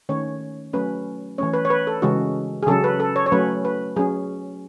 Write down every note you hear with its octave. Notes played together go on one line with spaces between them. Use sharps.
D#3 A3 C#4 C#5
F#3 A3 C#4 B4
E3 A3 C#4 C#5
B4
C#5
B4
A4
C#3 E3 G#3 C#4 F#4
G#4
C#3 F#3 C#4 A4
B4
A4
C#5
C#5
F#3 A3 C#4 B4
B4
F#3 C#4 G#4